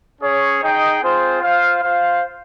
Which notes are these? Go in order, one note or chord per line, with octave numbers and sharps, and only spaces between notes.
C#4 G#4 C#5
D#4 G#4 D#5 G5
C4 F4 G#4 C5
F4 C5 F5
F4 C5 F5